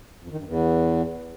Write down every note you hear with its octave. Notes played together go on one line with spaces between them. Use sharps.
F2
D#3
G2
E2